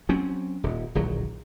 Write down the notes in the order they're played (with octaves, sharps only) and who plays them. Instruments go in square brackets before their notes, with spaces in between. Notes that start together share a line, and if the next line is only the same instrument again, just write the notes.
[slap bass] F#3 C4 C#4
D#1
D1 A#1 D#3 F#3